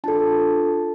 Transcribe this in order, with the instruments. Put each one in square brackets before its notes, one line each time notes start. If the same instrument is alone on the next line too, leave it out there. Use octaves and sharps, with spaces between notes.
[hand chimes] D4 F4 A4 A5